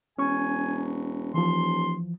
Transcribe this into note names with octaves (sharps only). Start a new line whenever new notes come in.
E1 C#4 G#5 C#6
D#1 E3 F3 C6